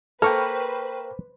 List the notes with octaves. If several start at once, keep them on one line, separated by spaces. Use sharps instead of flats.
A#3 A4 B4 C5 G5 C#6 F6